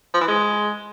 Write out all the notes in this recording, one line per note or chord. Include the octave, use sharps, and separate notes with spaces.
F3
E3
G#3